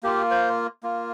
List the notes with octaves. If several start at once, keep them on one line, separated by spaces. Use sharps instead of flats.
A#3 F4 G4
C5
A#3 F4